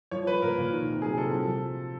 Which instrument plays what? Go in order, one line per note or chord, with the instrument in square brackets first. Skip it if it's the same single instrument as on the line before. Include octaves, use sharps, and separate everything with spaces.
[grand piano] F3 C#5
F3 B4
A#2 A#4
A#2
D#3
C3
F#3 G#4
C3 A4
F3
F3